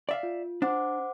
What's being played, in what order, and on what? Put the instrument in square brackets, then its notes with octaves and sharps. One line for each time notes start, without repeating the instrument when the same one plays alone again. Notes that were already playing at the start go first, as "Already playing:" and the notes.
[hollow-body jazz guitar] D5 E5 F5
[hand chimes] F4
[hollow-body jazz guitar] D4 [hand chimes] C5 F#5 D6